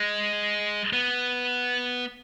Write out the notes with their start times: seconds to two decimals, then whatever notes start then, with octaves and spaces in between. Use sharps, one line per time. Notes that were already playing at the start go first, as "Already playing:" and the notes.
Already playing: G#3
0.93 B3